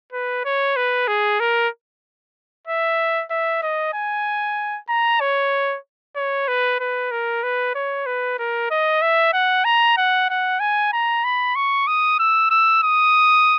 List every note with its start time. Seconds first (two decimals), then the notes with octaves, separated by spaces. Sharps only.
0.12 B4
0.45 C#5
0.76 B4
1.08 G#4
1.40 A#4
2.67 E5
3.30 E5
3.62 D#5
3.93 G#5
4.89 A#5
5.20 C#5
6.16 C#5
6.48 B4
6.79 B4
7.11 A#4
7.43 B4
7.74 C#5
8.06 B4
8.38 A#4
8.71 D#5
9.02 E5
9.33 F#5
9.65 A#5
9.97 F#5
10.29 F#5
10.60 G#5
10.92 A#5
11.24 B5
11.55 C#6
11.87 D#6
12.19 E6
12.50 E6
12.83 D#6